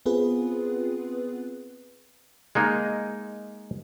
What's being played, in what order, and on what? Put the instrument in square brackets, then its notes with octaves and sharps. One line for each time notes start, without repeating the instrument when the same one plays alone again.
[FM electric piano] B3 C4 F4 G#4 B4
[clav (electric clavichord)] G#3 A#3 D#4